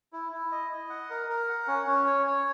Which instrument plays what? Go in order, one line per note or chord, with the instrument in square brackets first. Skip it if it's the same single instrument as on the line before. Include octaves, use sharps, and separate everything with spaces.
[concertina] E4
E4
D#5
D#5
F#5
A#4
A#4
F#5
C#4
C#4
C#5
C#5